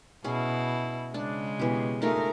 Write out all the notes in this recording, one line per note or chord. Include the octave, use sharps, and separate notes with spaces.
B2 C#4 E4 G#4
C#3 G#3 D4
B2 E3 G4
A3 D#4 F4 G#4 A#4